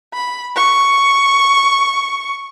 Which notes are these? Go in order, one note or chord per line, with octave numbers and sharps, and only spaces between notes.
B5
C#6